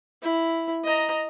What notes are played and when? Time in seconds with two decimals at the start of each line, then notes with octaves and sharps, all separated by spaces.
0.22 E4
0.84 D#5 A#5